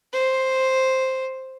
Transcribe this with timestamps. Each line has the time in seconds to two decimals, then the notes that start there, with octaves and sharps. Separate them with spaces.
0.13 C5